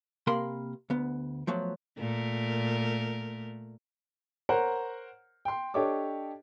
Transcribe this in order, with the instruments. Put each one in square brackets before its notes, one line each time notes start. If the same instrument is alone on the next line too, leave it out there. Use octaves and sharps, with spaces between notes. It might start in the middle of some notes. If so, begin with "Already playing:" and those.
[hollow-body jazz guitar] C3 A#3 A#4 B5 C6
D2 B3
F3 F#3 A3 B3
[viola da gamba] A#2 A3 A#4
[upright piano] A#4 C5 C#5 F#5 A#5
G5 C6
D4 G4 A4 C#5 D#5 D6